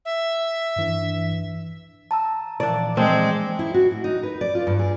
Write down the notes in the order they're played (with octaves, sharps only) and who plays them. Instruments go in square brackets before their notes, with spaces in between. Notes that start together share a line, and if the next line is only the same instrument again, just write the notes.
[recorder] E5
[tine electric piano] G2 E3 D4
[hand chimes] A5 A#5 E6
[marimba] A#2 E3 F3 [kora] D4 D5
[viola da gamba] G#3 [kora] C4 D4
[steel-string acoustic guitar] E4
F#4
A2
D#4
B4
D5
F4
G2
G#4